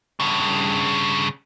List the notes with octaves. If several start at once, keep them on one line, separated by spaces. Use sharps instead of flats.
G2 C#3